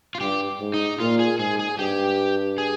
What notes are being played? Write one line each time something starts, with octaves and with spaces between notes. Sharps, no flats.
F4
G2 G4
G#2
D#4
A#2 F4
G#4
G#2 G#4
G#4
G2 G4
G#4